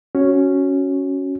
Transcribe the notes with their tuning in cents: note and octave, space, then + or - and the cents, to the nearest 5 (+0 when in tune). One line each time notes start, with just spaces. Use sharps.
C#4 +0 F#4 +0